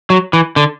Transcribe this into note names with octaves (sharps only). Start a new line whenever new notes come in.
F#3
E3
D3